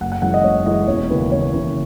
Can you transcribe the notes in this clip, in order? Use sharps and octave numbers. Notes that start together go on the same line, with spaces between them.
F#1 F#5
F#5
F#2 E3 G#3 F#5
D#5
F#1 C#5
F#2 E3 G#3 D#5
E1 C#5
D#2 C#3 E3 B4
E1 C#5
D#2 C#3 E3